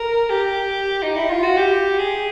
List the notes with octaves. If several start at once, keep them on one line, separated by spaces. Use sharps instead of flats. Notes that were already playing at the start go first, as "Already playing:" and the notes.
Already playing: A#4
G4
D#4
E4
F4
F#4
G4
G#4